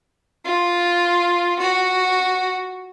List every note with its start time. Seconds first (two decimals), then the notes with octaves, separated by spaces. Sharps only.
0.45 F4
1.59 F#4